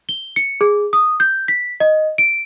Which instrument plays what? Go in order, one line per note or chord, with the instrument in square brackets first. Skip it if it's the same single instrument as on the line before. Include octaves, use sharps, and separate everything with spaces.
[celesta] G7
C#7
G#4
D#6
G6
B6
D#5
D7